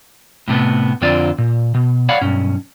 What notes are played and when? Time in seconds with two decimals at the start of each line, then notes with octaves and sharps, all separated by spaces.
0.48 A2 C3 A3 B3
1.01 F2 D3 C4 F4 D5
1.38 A#2
1.74 B2
2.09 C#5 D5 F5 F#5 B5
2.22 B1 G2 C#4